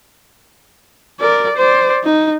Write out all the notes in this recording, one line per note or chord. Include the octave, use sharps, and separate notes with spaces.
A#4 D5
C5 D5
D#4